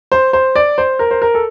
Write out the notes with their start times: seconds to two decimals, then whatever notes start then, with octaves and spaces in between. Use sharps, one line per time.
0.12 C5
0.33 C5
0.56 D5
0.78 C5
0.99 A#4
1.11 C5
1.22 A#4
1.34 A4